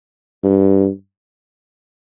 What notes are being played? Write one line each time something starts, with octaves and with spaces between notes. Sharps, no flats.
G2